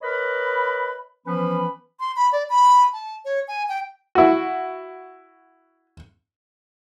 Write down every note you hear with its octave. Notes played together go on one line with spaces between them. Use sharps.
A#4 B4 C#5 D#5 B5
E3 F3 B3 C#4 B4 B5
C6
B5
D5
B5
A5
C#5
G#5
G5
E4 F#4